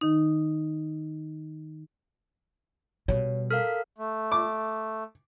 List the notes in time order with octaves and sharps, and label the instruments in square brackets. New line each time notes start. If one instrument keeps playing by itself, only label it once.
[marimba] D#3 D#4
[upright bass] B2 G3 [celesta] C#5
[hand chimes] A4 A#4 F5 [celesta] F6
[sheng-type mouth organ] A3
[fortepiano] D6